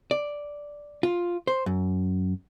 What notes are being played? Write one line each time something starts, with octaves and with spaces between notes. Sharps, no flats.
D5
F4
C5
F#2